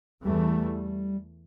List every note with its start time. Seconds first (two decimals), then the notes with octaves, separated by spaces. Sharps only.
0.25 E2 E3 G3 A3